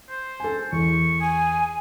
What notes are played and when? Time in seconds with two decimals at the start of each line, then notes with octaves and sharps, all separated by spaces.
0.10 C5
0.40 A4 G#5
0.72 E2 C#6
1.21 G#4 G#5